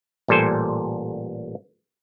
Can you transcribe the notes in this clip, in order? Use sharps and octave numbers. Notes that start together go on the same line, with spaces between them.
A1 A#2 G3 A4 C5 G#5